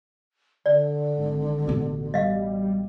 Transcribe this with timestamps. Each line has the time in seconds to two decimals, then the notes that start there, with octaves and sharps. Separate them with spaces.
0.66 D3 D5
1.17 G#1
1.67 A1 B2
2.14 G3 D#5 F5